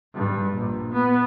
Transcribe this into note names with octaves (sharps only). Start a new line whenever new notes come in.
G2
A#1
B3